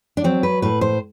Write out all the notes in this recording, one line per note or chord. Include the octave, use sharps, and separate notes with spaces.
D4
F#3 C4
B4
A2 B4
C5